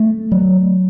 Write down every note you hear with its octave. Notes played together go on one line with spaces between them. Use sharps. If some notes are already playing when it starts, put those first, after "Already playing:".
Already playing: A3
F#3